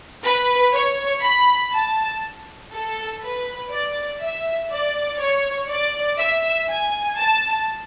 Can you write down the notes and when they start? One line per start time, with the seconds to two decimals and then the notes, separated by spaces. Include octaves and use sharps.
0.24 B4
0.74 C#5
1.23 B5
1.73 A5
2.73 A4
3.22 B4
3.71 D5
4.22 E5
4.71 D5
5.20 C#5
5.69 D5
6.19 E5
6.69 G#5
7.19 A5